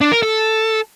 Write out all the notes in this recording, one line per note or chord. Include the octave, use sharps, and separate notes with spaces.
D4
A#4
A4